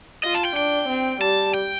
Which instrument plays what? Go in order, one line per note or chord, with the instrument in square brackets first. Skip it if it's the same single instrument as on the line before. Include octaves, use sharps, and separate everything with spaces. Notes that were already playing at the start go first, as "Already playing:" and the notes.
[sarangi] F4 [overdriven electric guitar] D#5
[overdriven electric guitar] A5
G5
[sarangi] D4 [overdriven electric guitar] G5
[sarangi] C4
[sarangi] G3 [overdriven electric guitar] A5
[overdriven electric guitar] G5